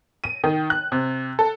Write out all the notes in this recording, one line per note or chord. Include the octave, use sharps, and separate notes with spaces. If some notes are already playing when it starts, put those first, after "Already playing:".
D#7
D#3
F#6
C3
A4